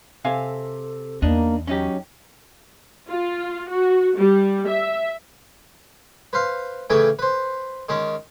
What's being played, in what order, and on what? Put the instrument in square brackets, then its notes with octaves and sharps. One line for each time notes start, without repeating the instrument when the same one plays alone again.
[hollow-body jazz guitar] C3 F5 G#5 [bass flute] A4
[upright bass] E2 [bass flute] A#3 [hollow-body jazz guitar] D4 D#4
[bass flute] F#3 [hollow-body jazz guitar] C#4 D#4 G4
[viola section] F4
F#4
G3
E5
[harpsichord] B4 C5 F5
A2 C#3 E3 A4 G5 G#5
B4 C5
D#3 G#3 C#4